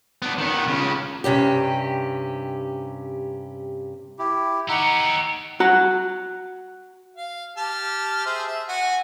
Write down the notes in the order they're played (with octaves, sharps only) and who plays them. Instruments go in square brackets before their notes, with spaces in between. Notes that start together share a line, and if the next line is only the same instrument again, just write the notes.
[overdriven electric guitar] B3 D4
D#3 B3
C#3 F4
[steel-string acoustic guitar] G2 C3 C#4 G4
[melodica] E4 G4
[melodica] D#4 F#5 E6 [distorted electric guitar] G4 C#5
[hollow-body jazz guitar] F#4 A#5
[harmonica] F5
G4 A5 F6
G#4 C5 E5
E5
F#4 F#5 G#5